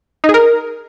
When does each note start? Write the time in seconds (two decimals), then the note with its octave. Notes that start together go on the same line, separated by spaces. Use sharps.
0.24 D#4
0.29 G#4
0.34 A#4